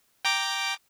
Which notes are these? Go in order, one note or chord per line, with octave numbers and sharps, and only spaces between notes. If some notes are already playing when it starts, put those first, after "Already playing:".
G5 A#5 D6